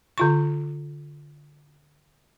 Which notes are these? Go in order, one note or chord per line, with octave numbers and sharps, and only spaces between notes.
D3 F4 C#6